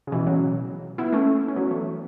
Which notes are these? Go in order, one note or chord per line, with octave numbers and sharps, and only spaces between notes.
C#3
B2 E3
C#3 F#3
B3 E4
A3 C#4
C#4
F#3 B3
E3 A3